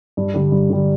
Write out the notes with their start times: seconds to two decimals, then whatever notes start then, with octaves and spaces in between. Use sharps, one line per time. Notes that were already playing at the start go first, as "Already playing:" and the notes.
0.17 G2
0.34 D3 G3
0.52 G2
0.70 D3 G3